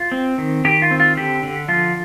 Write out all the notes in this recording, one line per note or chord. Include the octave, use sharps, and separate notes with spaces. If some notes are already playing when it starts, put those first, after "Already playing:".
Already playing: F4
C4
D#3
D#3 G4
F4
C4
F4
D3 G4
D3
F3 F4